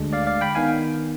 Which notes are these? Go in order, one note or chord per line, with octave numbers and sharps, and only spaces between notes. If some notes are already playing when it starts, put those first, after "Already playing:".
Already playing: D2 D3 G#3 D4
D5 F5
D5 F5
G5 B5
D#3 B3 D#4 F5 G#5